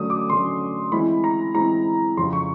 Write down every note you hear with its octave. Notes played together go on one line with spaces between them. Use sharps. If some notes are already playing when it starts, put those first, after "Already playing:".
Already playing: D3 F#3 A3 C#4 D#6
D6
D3 F#3 A3 C#4 C6
E3 G#3 C4 E4 B5
A#5
E3 G#3 C4 E4 A#5
F2 C#3 F3 C6
C#6